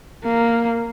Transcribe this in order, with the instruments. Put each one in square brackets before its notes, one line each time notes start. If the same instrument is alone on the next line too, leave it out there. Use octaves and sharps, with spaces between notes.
[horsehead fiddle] A#3